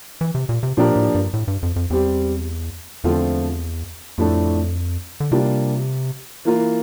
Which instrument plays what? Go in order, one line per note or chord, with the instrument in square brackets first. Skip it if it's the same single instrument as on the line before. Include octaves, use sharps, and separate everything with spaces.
[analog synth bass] E3
C3
A#2
C3
[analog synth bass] A#2 [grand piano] F3 A#3 D4 G4 A#4
[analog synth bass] A2
G2
A2
G2
F2
F2
[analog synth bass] E2 [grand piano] G3 C4 G4
[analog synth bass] E2 [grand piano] D3 F3 A3 C4 F4
[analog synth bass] F2 [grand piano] A2 F3 A3 D4
[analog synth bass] D3
[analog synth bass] C3 [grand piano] G3 A#3 D4 F4
[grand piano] E3 A#3 F4 A#4